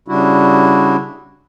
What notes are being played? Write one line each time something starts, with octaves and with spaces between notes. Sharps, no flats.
C#3 G3 D4 E4 F#4